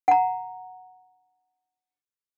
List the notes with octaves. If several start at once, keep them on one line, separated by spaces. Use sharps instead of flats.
F#5 A#5